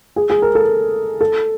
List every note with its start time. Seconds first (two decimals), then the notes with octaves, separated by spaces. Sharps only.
0.16 G#4
0.30 G#4
0.42 A#4
0.55 A4
1.21 A4